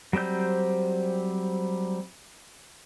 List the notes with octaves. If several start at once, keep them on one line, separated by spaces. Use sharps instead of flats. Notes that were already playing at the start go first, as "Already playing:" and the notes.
F#3 G3 C4 C5 G6